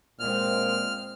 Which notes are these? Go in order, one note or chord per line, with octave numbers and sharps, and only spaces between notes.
A#2 G#3 C4 F6